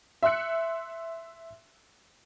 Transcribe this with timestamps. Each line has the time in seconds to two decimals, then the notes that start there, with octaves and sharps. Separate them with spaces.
0.23 E5 C6 E6 F#6 C#7